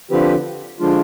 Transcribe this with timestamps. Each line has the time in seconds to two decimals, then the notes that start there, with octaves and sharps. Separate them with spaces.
0.11 D3 F3 C4 G4 B4
0.80 D3 F3 G#3 D4 F4